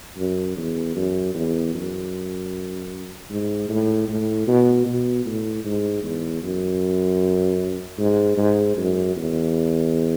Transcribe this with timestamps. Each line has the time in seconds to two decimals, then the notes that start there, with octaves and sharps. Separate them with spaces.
0.18 F#2
0.56 E2
0.96 F#2
1.34 E2
1.74 F#2
3.30 G#2
3.69 A2
4.08 A2
4.47 B2
4.86 B2
5.26 A2
5.64 G#2
6.03 E2
6.42 F#2
7.99 G#2
8.37 G#2
8.77 F#2
9.16 E2